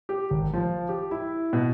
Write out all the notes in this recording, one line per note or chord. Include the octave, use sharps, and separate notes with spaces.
G4
G#1
F3
G4
E4
B2